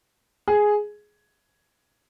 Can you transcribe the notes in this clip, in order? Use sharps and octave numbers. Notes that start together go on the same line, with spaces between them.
G#4